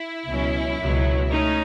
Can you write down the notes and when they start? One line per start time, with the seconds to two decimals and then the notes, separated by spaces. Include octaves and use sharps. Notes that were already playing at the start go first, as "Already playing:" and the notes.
Already playing: E4
0.28 C#2 B2 F#3 C#4
0.80 C#2 B2 F#3
1.32 A3 C#4 D#4